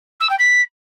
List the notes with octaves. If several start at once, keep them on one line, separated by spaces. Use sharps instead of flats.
E6
G5
B6